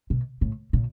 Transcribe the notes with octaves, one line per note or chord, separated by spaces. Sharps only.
B2
A2
A#2